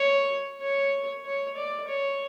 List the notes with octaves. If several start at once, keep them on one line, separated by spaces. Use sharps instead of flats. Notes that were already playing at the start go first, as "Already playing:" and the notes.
Already playing: C#5
C#5
C#5
D5
C#5